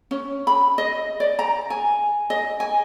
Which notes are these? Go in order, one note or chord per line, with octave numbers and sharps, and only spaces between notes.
C#4
B5
D#5
D5
A#5
G#5
D#5
G#5